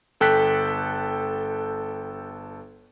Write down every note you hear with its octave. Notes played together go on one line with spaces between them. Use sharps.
G1 A4 G5 F#6 B6